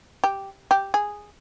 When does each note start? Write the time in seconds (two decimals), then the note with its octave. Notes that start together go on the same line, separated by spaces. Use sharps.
0.24 G4
0.71 G4
0.94 G#4